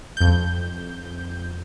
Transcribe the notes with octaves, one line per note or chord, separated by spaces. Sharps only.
F2 G6